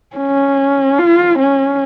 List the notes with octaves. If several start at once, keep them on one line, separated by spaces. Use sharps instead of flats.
C#4
F4
C#4